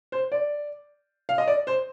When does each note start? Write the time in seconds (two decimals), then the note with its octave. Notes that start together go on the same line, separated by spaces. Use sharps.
0.12 C5
0.32 D5
1.29 F5
1.38 D#5
1.47 D5
1.67 C5